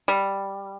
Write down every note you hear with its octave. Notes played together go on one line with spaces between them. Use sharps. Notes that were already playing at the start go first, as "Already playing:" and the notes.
G3